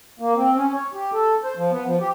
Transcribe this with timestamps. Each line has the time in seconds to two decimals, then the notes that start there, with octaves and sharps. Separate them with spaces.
0.19 A#3
0.36 C4
0.56 C#4
0.75 C#5
0.94 G4
1.13 A4
1.44 C5
1.57 F3
1.71 B3
1.86 F3
2.01 G4